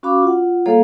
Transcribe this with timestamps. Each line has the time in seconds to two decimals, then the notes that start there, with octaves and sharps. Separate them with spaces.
0.03 C#4 F#4 F5 B5 D6
0.23 F4 F#5
0.66 G3 A#3 G#4 A4 C#5 F5